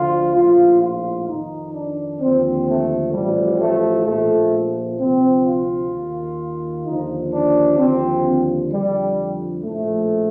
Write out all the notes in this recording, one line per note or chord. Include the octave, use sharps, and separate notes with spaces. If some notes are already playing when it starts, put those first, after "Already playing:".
Already playing: D2 D3 F3 F4
A#1 A2 F3 F4
F4
F2 D#3 D#4
D4
D#2 D3 F3 C4
A3
A1 A2 F3 G3
A3
A#1 A#2 F3 A3
D2 C3 F3 C4
F4
D#2 D#3
D#2 D3 F3 D#4
D4
D#2 D3 F3 C4
F2 D3 F3 G3
A#1 A2 F3 A3